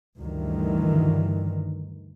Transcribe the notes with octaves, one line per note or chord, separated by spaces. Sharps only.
D2 G2 D#3 E3